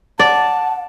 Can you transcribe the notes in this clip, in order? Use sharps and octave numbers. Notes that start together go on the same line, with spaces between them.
D5 F#5 A5